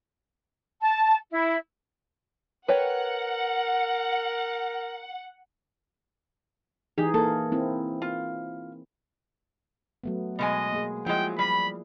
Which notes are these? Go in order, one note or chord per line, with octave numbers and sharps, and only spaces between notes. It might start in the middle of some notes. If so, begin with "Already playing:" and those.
A5
E4
A#4 B4 C#5 F#5 G5
E3 D#4 G4 G#4
A#3 A4 A#4
C4 E4
F4
F#3 A3 B3
B2 G#3 D#5 G#5
A#3 G#4
F3 F#3 G#3 E4 G#4 G5
G3 B5